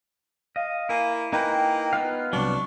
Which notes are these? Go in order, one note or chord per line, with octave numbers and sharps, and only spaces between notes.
D#5 F5
A#3 E4 G#5
A#3 D#4 B4 G5
B3 F4 F5
C2 F#3 D4 C#6